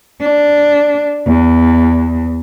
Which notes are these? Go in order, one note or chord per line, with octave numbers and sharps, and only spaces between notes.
D4
E2